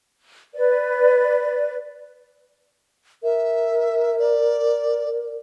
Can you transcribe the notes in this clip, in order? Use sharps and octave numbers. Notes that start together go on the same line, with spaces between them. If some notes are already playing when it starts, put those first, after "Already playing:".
B4 D5
A#4 E5
D5